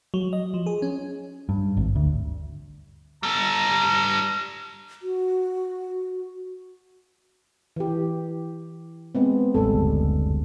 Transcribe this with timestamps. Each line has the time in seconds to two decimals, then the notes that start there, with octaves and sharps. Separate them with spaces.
0.14 F#3
0.33 D#5
0.54 F3
0.66 G#4
0.82 C#4
1.49 G2
1.77 G#1
1.96 D2
3.23 G3 A4 A#5
5.02 F#4
7.76 E3 G4
9.15 G#3 B3 C4
9.54 A1 E2 G3 G#3 A4
9.72 F#1 D2 G2